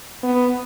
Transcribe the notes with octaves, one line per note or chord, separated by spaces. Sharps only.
B3